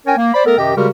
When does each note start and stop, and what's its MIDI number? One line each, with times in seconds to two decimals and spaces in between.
0.06 0.17 61
0.06 0.17 70
0.06 0.17 73
0.06 0.17 79
0.06 0.17 80
0.17 0.32 58
0.34 0.45 72
0.34 0.45 74
0.34 0.45 83
0.46 0.57 57
0.46 0.57 59
0.46 0.57 69
0.46 0.57 70
0.58 0.73 42
0.58 0.73 48
0.58 0.73 51
0.58 0.73 67
0.58 0.73 75
0.58 0.73 79
0.75 0.88 49
0.75 0.88 55
0.75 0.88 56
0.75 0.88 66
0.75 0.88 67
0.75 0.88 70